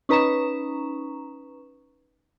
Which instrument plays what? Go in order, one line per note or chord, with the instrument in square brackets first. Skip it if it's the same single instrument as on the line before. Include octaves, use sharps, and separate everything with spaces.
[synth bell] C#4 D#4 B4 A#5 C#6 E7